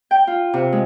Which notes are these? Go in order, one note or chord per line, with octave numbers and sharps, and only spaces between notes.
G5
F4
C3
G#3